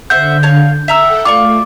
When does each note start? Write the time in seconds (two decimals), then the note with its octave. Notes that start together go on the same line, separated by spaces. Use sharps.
0.10 D3 C5 E5 F#5 G6
0.43 C#5 F5 A5
0.88 A4 E5 F#5 G5 A#5 E6
1.25 A3 F4 D5 C#6 D6